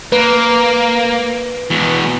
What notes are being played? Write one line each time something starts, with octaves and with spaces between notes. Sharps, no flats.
A#3 B4
E2 B2